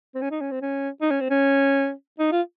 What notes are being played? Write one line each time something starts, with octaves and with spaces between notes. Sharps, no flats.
C4
C#4
D#4
C#4
C4
C#4
D#4
C#4
C4
C#4
D#4
F4